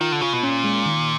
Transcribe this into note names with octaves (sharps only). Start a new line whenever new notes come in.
D#3 F4
D3
C#3 F4
B2
A#2 C#4
G#3
D#3